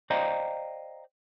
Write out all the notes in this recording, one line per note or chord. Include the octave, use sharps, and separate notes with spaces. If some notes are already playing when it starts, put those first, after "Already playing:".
C5 D5 D#5 F5 G5 A#5